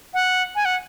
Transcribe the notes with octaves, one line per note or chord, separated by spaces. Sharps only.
F#5
G#5
F#5